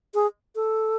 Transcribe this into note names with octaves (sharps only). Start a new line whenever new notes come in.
G#4
A4